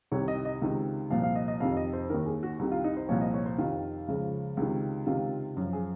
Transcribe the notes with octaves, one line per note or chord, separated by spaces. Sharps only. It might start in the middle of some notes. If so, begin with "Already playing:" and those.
C2 C3 D#3 C#5
D#5
D#5
C#2 C3 D#3
C2 A#2 F3 F5
F5
D#5
D#5
F2 C3 D#3 F5
D#5
C5
D#2 D#3 A#4
G#4
F#4
C2 C3 D#3
F4
D#4
C5
C2 A#2 F3 C#5
D#5
C#5
C5
F2 C3 D#3 F4
C#2 C#3 F3
C#2 C3 D#3
C#2 C3 D#3 F4
F#2 F3
G#4